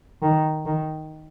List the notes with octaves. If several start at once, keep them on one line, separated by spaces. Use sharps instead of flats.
D#3
D#3